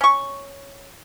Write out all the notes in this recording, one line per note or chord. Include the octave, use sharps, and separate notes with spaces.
C#4 C#6